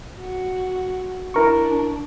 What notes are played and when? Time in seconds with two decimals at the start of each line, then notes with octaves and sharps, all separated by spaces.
0.19 F#4
1.34 D4 E4 A#4 C#6